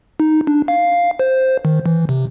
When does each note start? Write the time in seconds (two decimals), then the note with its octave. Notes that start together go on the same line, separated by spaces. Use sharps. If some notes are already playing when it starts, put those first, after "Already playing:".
0.20 D#4
0.47 D4
0.68 F5
1.19 C5
1.65 D#3
1.86 E3
2.09 C3